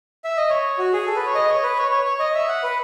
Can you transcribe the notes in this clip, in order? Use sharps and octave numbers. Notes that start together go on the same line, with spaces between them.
E5
D#5
C#5
F#4
G#4
A4
B4
C#5
D#5
C#5
B4
C#5
C#5
C#5
D#5
E5
F#5
B4